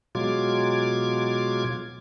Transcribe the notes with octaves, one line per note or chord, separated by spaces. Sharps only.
B2 F#3 G#3 F4 D6 G#6